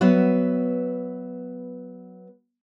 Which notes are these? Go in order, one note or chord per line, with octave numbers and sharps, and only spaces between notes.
F#3 B3 B4 E5